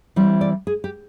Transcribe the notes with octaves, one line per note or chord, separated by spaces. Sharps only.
E3 G3 C4 E4
D5
G#4
G4